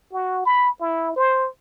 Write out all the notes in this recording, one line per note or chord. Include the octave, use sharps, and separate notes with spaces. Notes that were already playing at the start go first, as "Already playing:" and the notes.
F#4
B5
E4
C5